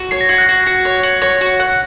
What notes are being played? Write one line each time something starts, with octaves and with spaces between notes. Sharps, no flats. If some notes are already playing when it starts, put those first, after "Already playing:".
Already playing: F#4
C#5 C7
A#6
F#4 G#6 C7
F#6 A#6
F#4
F#4
C#5
F#4
C#5 A#6 C#7
F#4
F#5